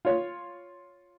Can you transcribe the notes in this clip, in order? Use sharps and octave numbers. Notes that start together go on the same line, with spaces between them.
F4 C#5